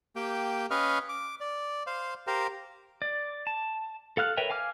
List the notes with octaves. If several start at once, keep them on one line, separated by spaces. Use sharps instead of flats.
A#3 G4 G5
C#4 B4 D#5 F5 C#6 F6
D6
D5
C5 F5
G4 A#4 C5 F5
D5
A5
A4 F5 F6 F#6
A#4 B4 C#5 E5 G5
F5 G#5 D6 F6